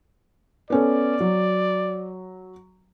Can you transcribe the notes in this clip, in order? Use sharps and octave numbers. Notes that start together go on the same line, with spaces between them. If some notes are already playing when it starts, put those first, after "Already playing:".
B3 C#4 A4 D5
F#3